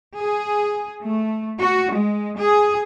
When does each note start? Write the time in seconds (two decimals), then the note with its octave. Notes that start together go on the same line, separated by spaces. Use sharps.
0.18 G#4
1.05 A3
1.60 F#4
1.95 G#3
2.38 G#4